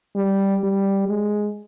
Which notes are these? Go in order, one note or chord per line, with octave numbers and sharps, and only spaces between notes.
G3
G3
G#3